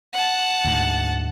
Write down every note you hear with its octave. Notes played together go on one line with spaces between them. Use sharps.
F#5 A5
D2 G#2